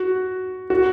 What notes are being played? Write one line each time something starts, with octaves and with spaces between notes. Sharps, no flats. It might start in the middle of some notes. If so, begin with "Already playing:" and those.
Already playing: F#4
F#4